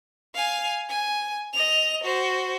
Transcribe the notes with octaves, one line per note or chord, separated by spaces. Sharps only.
F5 G#5
G#5
D#5 F7
F#4 C5